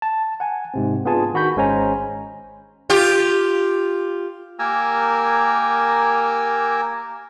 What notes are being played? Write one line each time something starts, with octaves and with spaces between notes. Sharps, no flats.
A5
F#5 G#5
G#2 C3 C4
B3 D4 F4 G#4 G#5 A5
D#3 F#4 B5 G6 B6
G#1 G#3 C#4 C5 G#5 A#5
F4 G4
A#3 G4 A#4 G#5 A#5 E6